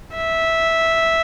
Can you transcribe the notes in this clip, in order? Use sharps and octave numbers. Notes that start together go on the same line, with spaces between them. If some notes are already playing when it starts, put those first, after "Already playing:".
E5